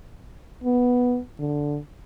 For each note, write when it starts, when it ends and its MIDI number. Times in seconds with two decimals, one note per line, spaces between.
0.64 1.18 59
1.39 1.78 50